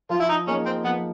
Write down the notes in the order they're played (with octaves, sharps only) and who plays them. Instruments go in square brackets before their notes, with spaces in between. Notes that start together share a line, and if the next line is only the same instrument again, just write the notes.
[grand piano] F3 [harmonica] F4
[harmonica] E4
D#4
[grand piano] A#3 D#4 G#4 [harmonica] C#4
[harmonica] C4
[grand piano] F3 [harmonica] B3